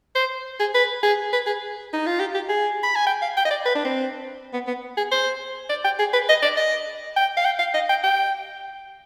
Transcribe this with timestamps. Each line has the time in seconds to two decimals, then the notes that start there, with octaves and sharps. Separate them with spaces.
0.15 C5
0.60 G#4
0.74 B4
1.03 G#4
1.33 B4
1.46 G#4
1.93 D#4
2.06 F4
2.20 G4
2.34 G4
2.49 G#4
2.83 B5
2.96 G#5
3.07 G5
3.22 F5
3.37 G5
3.45 D#5
3.51 D5
3.66 B4
3.75 D4
3.85 C4
4.53 B3
4.67 B3
4.97 G#4
5.11 C5
5.69 D5
5.84 G5
5.99 G#4
6.13 B4
6.29 D#5
6.42 D5
6.57 D#5
7.16 G5
7.37 F5
7.45 G5
7.59 F5
7.74 D#5
7.89 G5
8.04 G5